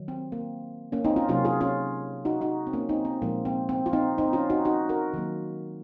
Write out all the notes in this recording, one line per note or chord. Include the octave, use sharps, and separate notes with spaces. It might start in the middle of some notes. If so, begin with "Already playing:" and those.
Already playing: D#3 F#3
C4
A#3
A#3 C#4
C4 D#4
C#4 F4
C3 F#3 A#3 C#4 F4
F4 G#4
C#4 F4
D#4 F#4
D#4 F#4
C4
A#3 C#4
C4 D#4
C4
A#2 F3 G#3 A#3
C4
C4
F4
C4 D#4
C4 D#4
C#4 F4
D#4 F#4
D#4 F#4
F#4 A#4
D#3 F#3 A#3